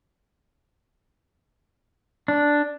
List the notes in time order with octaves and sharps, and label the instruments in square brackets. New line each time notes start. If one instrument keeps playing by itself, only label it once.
[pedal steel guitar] D4